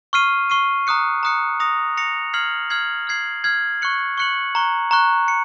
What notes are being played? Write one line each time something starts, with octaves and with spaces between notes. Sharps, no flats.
C#6 F6 C7 D#7
C#6 F6 C7 D#7
A#5 D#6 F#6 C#7
A#5 D#6 F#6 C#7
D#6 A#6 C#7 F7
D#6 A#6 C#7 F7
F6 G#6 C7 F#7
F6 G#6 C7 F#7
F6 G#6 C7 F#7
F6 G#6 C7 F#7
C#6 F#6 C#7 F#7
C#6 F#6 C#7 F#7
A#5 C#6 F#6
A#5 C#6 F#6
C#7